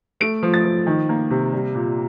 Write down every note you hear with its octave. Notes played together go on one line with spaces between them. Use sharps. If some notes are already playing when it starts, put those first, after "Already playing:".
A3 D7
F3
A6
F3
D#3
A#3
C3
G3
A#2